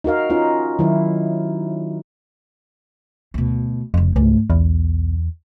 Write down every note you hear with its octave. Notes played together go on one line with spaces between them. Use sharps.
D#4 F#4 A#4 F5
C#4 D#4 F4
D#3 F#3 E4
D2 B2
F1 F2 C#3
C#2 G#2 A3
B1 E2